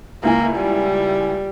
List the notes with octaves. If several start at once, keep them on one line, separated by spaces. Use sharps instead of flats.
C#2 A#3 E4 G#5
G3